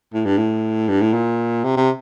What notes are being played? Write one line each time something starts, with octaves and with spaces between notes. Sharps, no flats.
A2
G2
A2
G2
A2
A#2
C3
C3